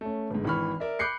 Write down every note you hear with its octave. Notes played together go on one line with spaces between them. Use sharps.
A3 C#4
G1 G#2
G#1 E3 B4 B5 C#6 F6
A#4 D5 E5
B5 D6 F#6 G6 C7 C#7